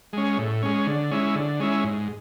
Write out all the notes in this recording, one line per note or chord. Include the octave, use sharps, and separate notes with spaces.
G#3 C#4
A2
G#3 C#4
D3
G#3 C#4 E4
D3
G#3 C#4 E4
G#2